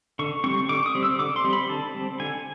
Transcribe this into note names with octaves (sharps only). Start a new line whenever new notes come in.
D3 C#6
G3 C4 C#6
D3 D6
D#6
G3 C4
E6
D3 D6
C6
G3 C4
B5
D3 A5
G3 C4
D3 G#5